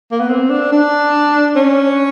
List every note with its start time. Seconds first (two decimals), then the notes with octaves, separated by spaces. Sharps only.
0.11 A#3
0.20 B3
0.29 C4
0.50 D4
0.72 D4
1.56 C#4